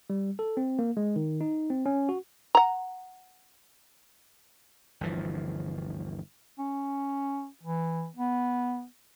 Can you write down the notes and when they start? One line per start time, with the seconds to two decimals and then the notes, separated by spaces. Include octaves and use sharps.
0.10 G3
0.39 A4
0.57 C4
0.79 A#3
0.97 G#3
1.16 D#3
1.41 D#4
1.70 C4
1.86 C#4
2.09 F#4
2.55 F#5 A#5
5.01 G1 D2 E3 F3
6.58 C#4
7.63 E3
8.16 B3